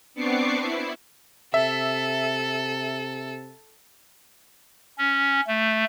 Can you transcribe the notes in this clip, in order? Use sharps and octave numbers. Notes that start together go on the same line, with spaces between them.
B3 C4 D4 C#6 D6 C7
E4
C3 A4 E5
C#4
A3